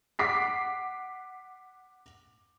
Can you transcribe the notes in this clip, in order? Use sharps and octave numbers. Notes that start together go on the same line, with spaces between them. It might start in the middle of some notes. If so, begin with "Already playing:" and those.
F#5 D6 B6 C7